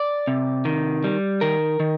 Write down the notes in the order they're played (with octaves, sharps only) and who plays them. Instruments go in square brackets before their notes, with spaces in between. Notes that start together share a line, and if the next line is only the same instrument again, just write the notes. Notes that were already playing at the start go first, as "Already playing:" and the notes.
Already playing: [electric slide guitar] D5
C3
D#3
G3
D#3 A#4
D#3